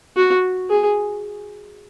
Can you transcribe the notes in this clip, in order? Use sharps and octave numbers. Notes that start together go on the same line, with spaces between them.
F#4
G#4